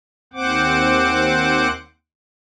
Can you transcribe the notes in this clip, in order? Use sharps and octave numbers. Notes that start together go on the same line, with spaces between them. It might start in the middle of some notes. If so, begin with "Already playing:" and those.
D#2 C4 C5 F#5 D6